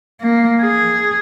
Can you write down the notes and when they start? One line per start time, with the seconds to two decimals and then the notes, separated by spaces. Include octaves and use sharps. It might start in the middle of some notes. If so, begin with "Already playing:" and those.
0.22 A#3
0.61 G#4